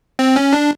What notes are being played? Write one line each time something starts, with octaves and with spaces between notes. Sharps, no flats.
C4
C#4
D4